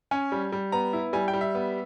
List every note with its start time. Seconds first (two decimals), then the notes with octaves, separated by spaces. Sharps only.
0.11 C#4 G#5
0.32 G3
0.52 G3
0.72 B3 A#5
0.93 E4
1.13 G3 G#5
1.28 G5
1.33 G3
1.41 E5
1.55 B3